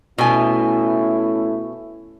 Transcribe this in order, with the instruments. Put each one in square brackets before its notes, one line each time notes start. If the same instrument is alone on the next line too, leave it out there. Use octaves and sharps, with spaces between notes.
[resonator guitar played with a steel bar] B2 G#5 [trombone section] A3 C#4 E4